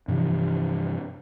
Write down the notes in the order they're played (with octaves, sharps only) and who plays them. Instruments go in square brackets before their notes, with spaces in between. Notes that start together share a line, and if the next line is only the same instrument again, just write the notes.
[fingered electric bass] G2 C3 E3 F3